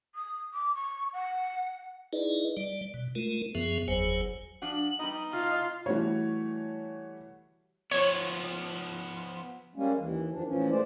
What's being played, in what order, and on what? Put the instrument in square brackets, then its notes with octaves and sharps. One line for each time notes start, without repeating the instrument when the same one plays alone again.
[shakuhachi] D#6
D6
C#6
F#5
[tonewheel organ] D#4 E4 G#4 B4 D5 D#5
G3 D5
B2
G#3 A3 F4 A#4
F#2 F3 B3 G#4 E5
F#1 E2 F#3 G#4 C5 G#5
[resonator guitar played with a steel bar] F3 D4 F#4 [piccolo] F#7
[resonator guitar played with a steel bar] G3 B3 [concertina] D#4 D#5
[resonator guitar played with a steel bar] A2 C3 [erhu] F4 [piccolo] F6
[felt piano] E3 G3 A3 F#4 C#5
[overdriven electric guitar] F3 B3 [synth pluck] C#5
[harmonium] G3 G#3 A#3 C#4
D#2 E3
F2 D#3 F3 D4
A2 E3 F3 C#4
G#3 A3 C5 D5